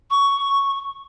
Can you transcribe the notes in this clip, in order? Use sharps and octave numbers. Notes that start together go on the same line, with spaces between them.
C#6